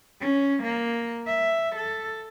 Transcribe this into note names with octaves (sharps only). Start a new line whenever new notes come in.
C#4
A#3
E5
A4